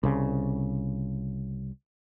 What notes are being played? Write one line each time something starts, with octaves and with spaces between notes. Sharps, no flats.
C2 C#3